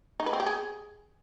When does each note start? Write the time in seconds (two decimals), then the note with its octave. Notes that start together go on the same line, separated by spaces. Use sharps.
0.20 D#4
0.26 B4
0.33 C4
0.40 G4
0.46 G#4